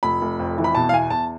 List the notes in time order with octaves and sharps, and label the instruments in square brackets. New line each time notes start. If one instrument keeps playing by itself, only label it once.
[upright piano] F1 B5
F1
F2
E3
B5
B2 A5
F5
E2 G#5
E2 A5